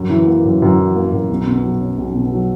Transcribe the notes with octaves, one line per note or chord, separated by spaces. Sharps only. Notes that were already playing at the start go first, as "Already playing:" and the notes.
Already playing: F#2
E3
A#3
F#2
F#2
E3
A#3
F#2
B1
B2
F#3
C#4
B1
B2
F#3